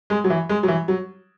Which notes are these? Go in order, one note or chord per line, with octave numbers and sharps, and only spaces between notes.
G#3
F#3
E3
G#3
F#3
E3
F#3